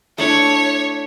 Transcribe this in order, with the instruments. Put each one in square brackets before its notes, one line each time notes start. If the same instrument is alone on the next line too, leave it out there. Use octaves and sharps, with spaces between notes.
[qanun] A3 D4 E4 [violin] C#5